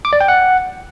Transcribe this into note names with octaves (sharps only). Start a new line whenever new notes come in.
D6
D5
G5
F#5